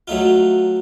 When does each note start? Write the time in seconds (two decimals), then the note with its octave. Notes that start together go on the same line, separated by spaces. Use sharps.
0.08 F#3 A3 D#4 F4